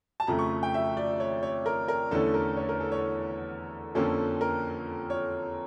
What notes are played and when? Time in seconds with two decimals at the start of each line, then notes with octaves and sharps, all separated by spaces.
0.20 A5
0.27 F2 C#3 F3 A3 A#5
0.39 C#6
0.63 G5
0.74 E5
0.97 D5
1.20 C#5
1.43 C#5
1.66 A#4
1.88 A#4
2.11 E2 D3 A3 C#4 A4
2.34 A#4
2.57 C#5
2.69 A#4
2.80 A4
2.92 C#5
3.95 F2 D3 F3 A#3 C#4 A4
4.41 A#4
5.10 C#5